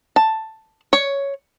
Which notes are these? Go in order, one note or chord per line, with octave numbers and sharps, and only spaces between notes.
A5
C#5